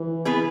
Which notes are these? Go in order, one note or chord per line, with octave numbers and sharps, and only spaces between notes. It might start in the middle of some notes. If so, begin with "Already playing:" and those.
Already playing: E3
B3 G#4 B4